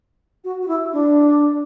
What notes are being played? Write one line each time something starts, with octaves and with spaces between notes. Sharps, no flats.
F#4
F#4
E4
D4